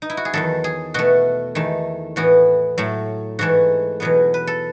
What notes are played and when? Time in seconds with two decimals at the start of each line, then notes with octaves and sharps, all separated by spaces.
0.02 D#4
0.10 E4
0.17 F#4
0.25 G#4
0.33 E2 D#3 F#3 A4
0.64 G#4
0.94 B2 A3 F#4
1.55 E2 D#3 A3
2.16 A2 E3 B3 F#4
2.78 A2 F#3 A3
3.39 G#2 E3 A3 F#4
4.00 E2 B2 F#3 B3
4.34 B4
4.47 A4